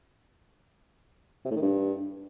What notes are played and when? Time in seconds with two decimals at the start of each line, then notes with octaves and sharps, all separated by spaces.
1.45 C3
1.50 A2
1.56 D#3
1.62 G2